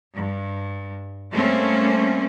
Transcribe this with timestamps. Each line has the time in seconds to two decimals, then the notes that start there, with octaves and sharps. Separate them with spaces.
0.13 G2
1.31 G3 A3 A#3 C4 C#4